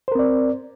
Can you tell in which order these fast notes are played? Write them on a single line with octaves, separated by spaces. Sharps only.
C5 A#4 C4 D5